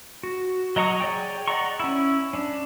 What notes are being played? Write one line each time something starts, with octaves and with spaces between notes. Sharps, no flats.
F#4
F#3 D#5 A#5 C#6 D#6
G#4 C#5 D5 G5
D5 D#5 F#5 A#5 C#6
C#4 E4
C#4 D4